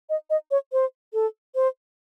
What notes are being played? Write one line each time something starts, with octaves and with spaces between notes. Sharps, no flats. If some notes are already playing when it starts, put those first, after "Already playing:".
D#5
D#5
C#5
C5
A4
C5